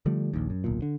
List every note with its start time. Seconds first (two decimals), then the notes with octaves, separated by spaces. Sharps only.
0.06 D3 F3 G3 A3
0.33 A#1 D#2
0.50 F#2
0.64 D1 B1 A#2
0.82 D3